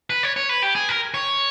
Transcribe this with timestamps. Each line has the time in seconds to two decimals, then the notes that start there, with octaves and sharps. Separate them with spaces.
0.10 B4
0.23 C#5
0.36 C#5
0.49 B4
0.62 G4
0.75 G#4
0.89 A#4
1.14 C#5